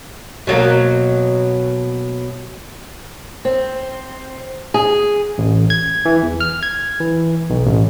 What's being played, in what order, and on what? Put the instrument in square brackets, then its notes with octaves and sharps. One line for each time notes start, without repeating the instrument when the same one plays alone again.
[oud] B2 F#3 A#3
[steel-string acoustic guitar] C4
G#4
[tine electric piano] A1
G#6
E3
E2
F6
G#6
E3
B1
A1